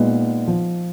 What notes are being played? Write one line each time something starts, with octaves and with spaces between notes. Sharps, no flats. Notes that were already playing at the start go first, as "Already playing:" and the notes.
Already playing: A#2 G#3 B3 D#4
F3